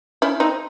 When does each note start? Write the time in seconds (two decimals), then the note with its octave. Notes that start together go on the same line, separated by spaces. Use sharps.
0.22 C#4 E4
0.40 C4 D#4